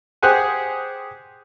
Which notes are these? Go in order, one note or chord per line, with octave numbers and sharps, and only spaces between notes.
G4 G#4 C5 F#5 G#5